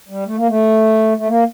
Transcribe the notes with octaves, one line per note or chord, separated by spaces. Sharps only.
G3
A3
A#3
A3
A3
A#3